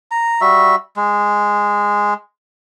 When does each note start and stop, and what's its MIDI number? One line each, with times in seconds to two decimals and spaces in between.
0.11 0.41 82
0.41 0.75 55
0.41 0.75 66
0.41 0.75 76
0.97 2.14 56